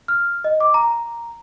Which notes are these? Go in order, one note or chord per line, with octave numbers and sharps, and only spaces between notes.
F6
D#5
D6
A#5